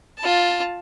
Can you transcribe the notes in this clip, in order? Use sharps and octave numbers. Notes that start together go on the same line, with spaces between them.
F4 A5